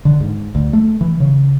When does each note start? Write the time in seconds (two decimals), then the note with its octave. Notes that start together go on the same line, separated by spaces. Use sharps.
0.05 D3
0.20 G#2
0.55 D2
0.73 A3
1.01 E3
1.20 C#3